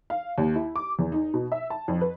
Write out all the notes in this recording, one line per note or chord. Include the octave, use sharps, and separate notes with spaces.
F5
D#2
E4
D6
E2
D#4
B2
E5
A5
F2
B4